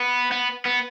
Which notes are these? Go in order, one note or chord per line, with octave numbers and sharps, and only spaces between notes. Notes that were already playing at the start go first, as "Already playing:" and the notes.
Already playing: B3
B3
B3